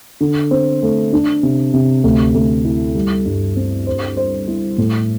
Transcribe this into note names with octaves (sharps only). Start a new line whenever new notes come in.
D3
C4
A3
D4
C3
C3
D2
D2
E4
G3
G2
C4
C5
C5
E4
A2